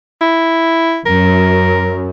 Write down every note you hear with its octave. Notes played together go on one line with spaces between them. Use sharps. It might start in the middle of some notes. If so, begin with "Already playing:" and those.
E4
F#2 A#4